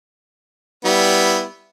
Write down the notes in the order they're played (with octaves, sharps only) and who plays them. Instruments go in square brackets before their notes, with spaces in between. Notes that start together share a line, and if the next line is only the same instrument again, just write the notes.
[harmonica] G3 B3 E4